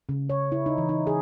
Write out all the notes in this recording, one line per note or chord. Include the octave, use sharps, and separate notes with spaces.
C#3
C#5
E4
D#4
E3
D#4
G#4